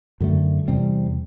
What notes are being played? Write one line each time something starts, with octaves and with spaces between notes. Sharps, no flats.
F#2 D3 A3
E2 C3 G3 C4